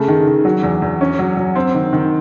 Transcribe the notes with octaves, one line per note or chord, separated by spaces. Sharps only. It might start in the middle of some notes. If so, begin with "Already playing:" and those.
Already playing: C#3 A3
D#3
D#3
F#3
E2
E2
C#4
F#3
F#3
C4
D#3
D#3